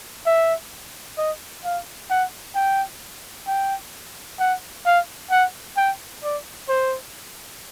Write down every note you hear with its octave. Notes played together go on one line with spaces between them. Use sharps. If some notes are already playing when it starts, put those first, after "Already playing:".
E5
D#5
F5
F#5
G5
G5
F#5
F5
F#5
G5
D5
C5